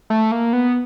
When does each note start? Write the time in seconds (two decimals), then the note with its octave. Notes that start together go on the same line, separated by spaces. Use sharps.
0.10 A3
0.31 A#3
0.53 B3